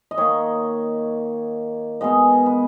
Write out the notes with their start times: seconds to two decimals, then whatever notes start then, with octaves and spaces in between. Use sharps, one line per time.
0.11 D#5
0.18 D#3 A#3 C#5
2.01 B2 G#3 B3 D#5
2.46 B4